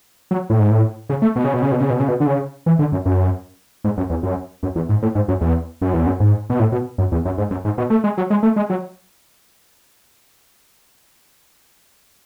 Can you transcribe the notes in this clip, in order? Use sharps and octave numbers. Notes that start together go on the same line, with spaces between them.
F#3
A2
G#2
A2
C#3
A3
B2
C#3
B2
C#3
B2
C#3
B2
C#3
B2
D3
C#3
E3
D3
F#2
F#2
G#2
F#2
E2
F#2
F#2
E2
G#2
A2
G#2
F#2
E2
F#2
E2
F#2
G#2
B2
A2
B2
F#2
E2
F#2
G#2
F#2
G#2
B2
A3
G#3
F#3
G#3
A3
G#3
F#3